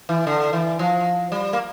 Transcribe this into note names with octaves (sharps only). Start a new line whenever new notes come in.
E3
D3
E3
F3
G3
A#3